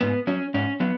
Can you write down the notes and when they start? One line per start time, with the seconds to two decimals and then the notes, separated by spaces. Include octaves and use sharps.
0.01 G#2 B3
0.27 F#3 C#4
0.54 G#2 C#4
0.80 F#3 B3